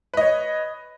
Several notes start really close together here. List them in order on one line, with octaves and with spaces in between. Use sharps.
B4 D#5 C#5